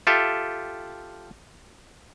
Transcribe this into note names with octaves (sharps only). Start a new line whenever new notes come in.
F4 G4 A4 E5